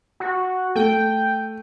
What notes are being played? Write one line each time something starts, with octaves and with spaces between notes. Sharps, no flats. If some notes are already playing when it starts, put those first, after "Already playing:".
F#4
A3 G5